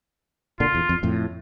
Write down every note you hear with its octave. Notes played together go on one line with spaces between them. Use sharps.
A#2 D3 F4
E2
F2
F2 A2